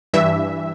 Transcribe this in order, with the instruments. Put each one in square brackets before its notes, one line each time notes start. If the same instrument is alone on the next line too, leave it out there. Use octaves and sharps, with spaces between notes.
[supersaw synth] G2 E3 E5